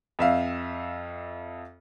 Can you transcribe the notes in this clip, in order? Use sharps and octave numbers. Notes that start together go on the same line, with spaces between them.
F2 E5 F5